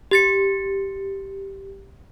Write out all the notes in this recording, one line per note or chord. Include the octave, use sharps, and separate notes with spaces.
G4 A6 C#7